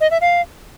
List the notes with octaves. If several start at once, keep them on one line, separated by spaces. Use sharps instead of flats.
D#5
E5
F5